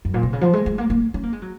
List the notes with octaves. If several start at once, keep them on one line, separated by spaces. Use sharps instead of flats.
F#2
A#2
C3
C#3
F3
G#3
G#3
A#3
A#3
C#4
A#3
G#3
F#3